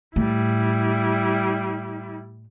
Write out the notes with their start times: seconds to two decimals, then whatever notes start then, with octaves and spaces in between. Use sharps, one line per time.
0.16 A2 G3 E4